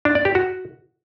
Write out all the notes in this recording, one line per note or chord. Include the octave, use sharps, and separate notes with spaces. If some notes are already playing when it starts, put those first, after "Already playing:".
D4
D5
G4
F#4